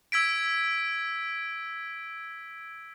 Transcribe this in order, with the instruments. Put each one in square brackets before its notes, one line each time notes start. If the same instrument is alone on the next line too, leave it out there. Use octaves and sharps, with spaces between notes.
[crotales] E6 G#6 B6 D7